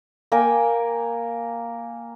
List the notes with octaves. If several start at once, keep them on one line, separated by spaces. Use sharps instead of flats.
A#3 A#4 G5 G#5